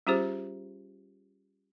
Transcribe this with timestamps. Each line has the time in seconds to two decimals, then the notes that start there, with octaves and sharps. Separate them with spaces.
0.07 G3 C#4 F4 G4 G#4 C5